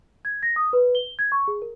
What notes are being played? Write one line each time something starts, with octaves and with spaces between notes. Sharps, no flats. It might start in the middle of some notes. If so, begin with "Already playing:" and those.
G#6
A#6
D#6
B4
G7
G#6
C#6
G#4
A#4